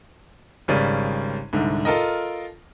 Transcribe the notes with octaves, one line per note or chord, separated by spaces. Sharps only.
G#1 C#3 G3 C#4 D5 D#7
C2 G#2 D3
F4 A4 A#4 D#5